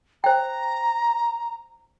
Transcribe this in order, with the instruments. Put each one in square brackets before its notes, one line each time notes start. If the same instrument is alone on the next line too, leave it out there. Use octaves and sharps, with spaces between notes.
[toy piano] C5 G5 [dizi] A#5